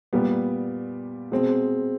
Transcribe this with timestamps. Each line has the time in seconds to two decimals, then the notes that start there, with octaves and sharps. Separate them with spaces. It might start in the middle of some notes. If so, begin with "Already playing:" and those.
0.13 A#2 G3 B3
1.32 B2 G#3 C4